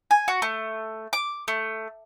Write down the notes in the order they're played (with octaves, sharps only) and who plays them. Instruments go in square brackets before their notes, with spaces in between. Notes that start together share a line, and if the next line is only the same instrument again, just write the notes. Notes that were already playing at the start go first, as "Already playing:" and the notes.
[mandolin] G#5
F#4
A3
D6
A3